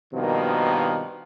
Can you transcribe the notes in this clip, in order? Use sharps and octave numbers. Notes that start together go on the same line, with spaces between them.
G2 B2 D#3 F3 A#3